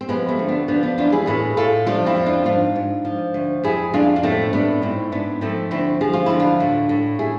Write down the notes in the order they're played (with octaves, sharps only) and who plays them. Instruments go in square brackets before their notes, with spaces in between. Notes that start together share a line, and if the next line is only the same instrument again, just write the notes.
[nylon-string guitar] C4
F3 G#3 B3
A3 C4
D2
B3 D4
F3 B3 D4
B3 D4
E2 D4 F4
E4 G#4
A2 G#4 B4
A2 F4 A4
F3 D4 F4
C4 E4
F2
D4 F4
G#2 D4 F4
G#2
F3
D2
F2 E4 G#4
F2 D4 F4
D4
A2 A3 C4
A2 B3 D4
G#2 C4 E4
G#2 B3 D4
F3 A3 C4
D2 C4 E4
F3 G#4
F4
D2 E4
D4 F4
A2
A2
E4 G#4